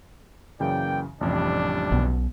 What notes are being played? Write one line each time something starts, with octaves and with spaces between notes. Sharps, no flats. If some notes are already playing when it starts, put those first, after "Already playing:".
F#2 C#3 E3 A#3 D5 G5
A1 F2 C3 G3 D4
B1 B2